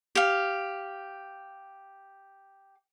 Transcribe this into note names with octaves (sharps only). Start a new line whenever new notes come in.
G4 F5